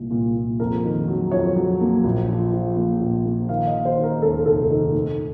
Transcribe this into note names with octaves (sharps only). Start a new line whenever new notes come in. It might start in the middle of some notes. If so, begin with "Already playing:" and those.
Already playing: C2 A#2 A#3
A#2
A#2
F2 A#4
D#3
F#3
F2 C#5
F#3
A#3
A#1
F3
F3
A#3
A#1
A#3
D#3 F5
D#5
D#3
C5
D#3
A#4
D#2 A4
F1 A4
D#3
A3